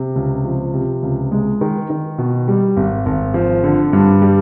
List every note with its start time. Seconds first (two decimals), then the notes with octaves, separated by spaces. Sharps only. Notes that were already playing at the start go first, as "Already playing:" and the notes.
Already playing: C3
0.16 C#2
0.45 F3
0.74 C3
1.03 C#2
1.32 G#3
1.61 D#3
1.90 D#3
2.18 B2
2.48 G3
2.77 G#1
3.06 G#1
3.34 F3
3.64 D3
3.93 G2
4.22 G3